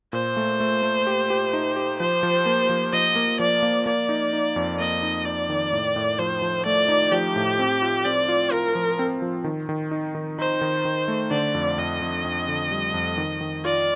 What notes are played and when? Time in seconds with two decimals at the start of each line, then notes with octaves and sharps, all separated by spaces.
0.13 A#2 C5
0.37 A3
0.60 A3
0.83 A3
1.07 G4
1.30 G4
1.53 D#4
1.76 G4
2.00 F3 C5
2.23 F3
2.46 A#3
2.69 F3
2.92 F3 D#5
3.16 A#3
3.39 F3 D5
3.63 A#3
3.86 A#3 D5
4.09 D#4
4.33 D#4
4.56 F2
4.79 A#3 D#5
5.03 D#4
5.25 D#4 D5
5.50 D#3
5.73 A2
5.96 A2
6.19 F3 C5
6.42 F3
6.66 A3 D5
6.88 D#4
7.12 F3 G4
7.36 A2
7.59 C4
7.82 F4
8.05 C4 D5
8.29 F4
8.51 F4 A#4
8.75 F3
8.99 C4
9.22 F3
9.44 D#3
9.69 D#3
9.91 D#4
10.15 D#3
10.38 D#4 C5
10.61 D#3
10.85 D#3
11.08 A3
11.31 D3 D5
11.54 F2
11.78 F2 D#5
12.01 F2
12.24 F2
12.48 D3
12.71 G3
12.94 F2
13.18 D#3
13.41 D#3
13.64 F4 D5